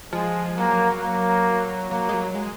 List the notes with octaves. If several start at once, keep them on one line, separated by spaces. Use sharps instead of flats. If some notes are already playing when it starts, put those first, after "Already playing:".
F3 G#3
F#3 A#3
A#3
F#3 A#3
G#3
F#3
G#3